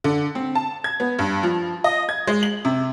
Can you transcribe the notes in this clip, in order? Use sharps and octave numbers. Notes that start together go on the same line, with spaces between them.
D3
C4
A5
G#6
B3
G2
F3
D#5
G#6
G#3
F#7
C3